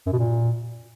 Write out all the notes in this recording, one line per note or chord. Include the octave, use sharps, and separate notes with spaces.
F#2
B2
A#2